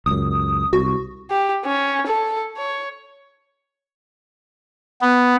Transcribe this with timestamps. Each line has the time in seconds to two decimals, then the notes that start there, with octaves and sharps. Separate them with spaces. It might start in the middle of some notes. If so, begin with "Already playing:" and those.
0.06 C#2 F#2 D#6
0.73 C2 F#4
1.30 G4
1.65 C#4
2.07 A4
2.57 C#5
5.02 B3